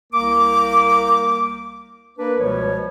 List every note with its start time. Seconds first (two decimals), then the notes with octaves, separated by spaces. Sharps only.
0.13 C2 A#3 A#4 D6
2.19 A#3 D4 A#4 B4
2.40 C#2 B2 F3 G3 C#5